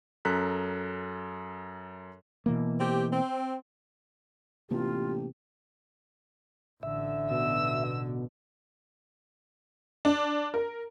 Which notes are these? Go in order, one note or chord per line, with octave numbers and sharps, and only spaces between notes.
F#2 A4 A#5 F#6 B6
B2 E3 A#3
C4 G4
C4
A1 C3 A#3 B3 F4 G4
A1 D3 E5
B2 E6
D4
A#4